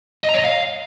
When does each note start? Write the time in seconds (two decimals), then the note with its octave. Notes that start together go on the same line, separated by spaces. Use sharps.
0.24 D#5
0.29 A#5
0.34 C#5
0.39 D#5
0.44 F5